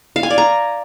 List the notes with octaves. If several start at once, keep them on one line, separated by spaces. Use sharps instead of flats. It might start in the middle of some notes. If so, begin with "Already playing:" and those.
F5
G#5
D5
A#5